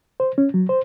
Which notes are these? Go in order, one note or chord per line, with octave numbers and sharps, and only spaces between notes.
C5
C#4
F#3
C5